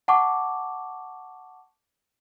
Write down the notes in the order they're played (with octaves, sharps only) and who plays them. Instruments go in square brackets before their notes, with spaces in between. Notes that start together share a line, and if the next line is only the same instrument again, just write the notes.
[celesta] F#5 A5 C#6 D6